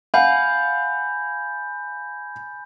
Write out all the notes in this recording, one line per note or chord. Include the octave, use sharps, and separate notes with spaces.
F5 F#5 G#5 B5 G6